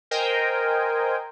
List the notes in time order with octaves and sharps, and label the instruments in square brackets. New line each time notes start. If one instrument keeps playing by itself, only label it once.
[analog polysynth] A#4 C5 D#5 G5 G#5